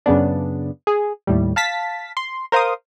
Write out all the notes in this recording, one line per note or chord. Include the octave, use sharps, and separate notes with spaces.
F#2 C#3 B3 D4
G#4
D#2 A2 G3
F5 A5 A6 B6
C6
A#4 C5 F5 C6 D#6